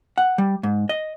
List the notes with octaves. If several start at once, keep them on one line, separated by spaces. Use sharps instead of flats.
F#5
G3
G#2
D#5